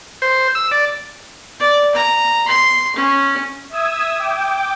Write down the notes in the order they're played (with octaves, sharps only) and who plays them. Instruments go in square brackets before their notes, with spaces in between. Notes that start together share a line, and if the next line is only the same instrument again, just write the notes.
[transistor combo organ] C5
E6
D5
[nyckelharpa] D5
A#5
C6
C#4
[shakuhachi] E5 [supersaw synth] D#6 E6 G#6
[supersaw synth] G5 D6